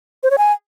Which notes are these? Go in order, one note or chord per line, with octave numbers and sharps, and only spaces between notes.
C5
C#5
G#5